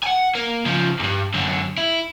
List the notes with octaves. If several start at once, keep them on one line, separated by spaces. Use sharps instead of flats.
F#5 G#5
A#3
C#3 F3
E2 G2
F#2 D3
E4